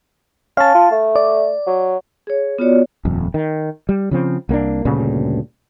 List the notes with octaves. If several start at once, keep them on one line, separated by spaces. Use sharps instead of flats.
C#4 F5 A5
F4
A3
D5
F#3
G#4 C#5
B3 F4 F#4 C#5 D5
D#1 F2
D#3
G3
C#3 F3 C4
C2 A#3 C4 D4
D2 G2 A#2 C#3